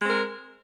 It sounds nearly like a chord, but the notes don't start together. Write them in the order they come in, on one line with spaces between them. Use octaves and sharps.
G#3 C4 A#4